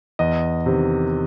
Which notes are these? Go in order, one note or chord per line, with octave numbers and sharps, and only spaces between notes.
E2 D#5
C3 D#3